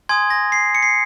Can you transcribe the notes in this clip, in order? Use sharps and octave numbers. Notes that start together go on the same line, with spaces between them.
G#5 C6 D#6 G#6
A#6
C7
C#7
C7